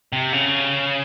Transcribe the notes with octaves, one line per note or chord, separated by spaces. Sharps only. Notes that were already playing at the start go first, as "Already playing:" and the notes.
C3
C#3